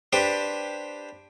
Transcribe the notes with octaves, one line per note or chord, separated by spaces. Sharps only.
D4 G4 B4 C5